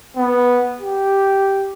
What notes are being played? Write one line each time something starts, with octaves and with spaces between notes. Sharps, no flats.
B3
G4